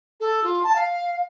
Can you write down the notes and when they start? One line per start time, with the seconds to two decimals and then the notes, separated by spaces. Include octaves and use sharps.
0.20 A4
0.43 F4
0.63 A5
0.76 F5